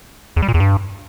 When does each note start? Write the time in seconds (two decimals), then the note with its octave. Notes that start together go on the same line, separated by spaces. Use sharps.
0.36 E2
0.42 G3
0.48 A#2
0.54 E2
0.60 G2